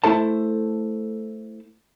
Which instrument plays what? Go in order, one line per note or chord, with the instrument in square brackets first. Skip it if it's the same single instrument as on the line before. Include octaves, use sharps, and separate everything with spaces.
[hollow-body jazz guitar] A3 E4 A4 C5 A5